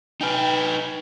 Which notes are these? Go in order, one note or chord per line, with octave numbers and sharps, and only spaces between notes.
D#4 B4 G5 G#5 F6